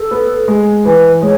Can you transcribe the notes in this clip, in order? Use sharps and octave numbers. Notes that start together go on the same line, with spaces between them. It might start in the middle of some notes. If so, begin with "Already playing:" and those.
Already playing: A4
B3
G#3
E3 B4
G#3 C#5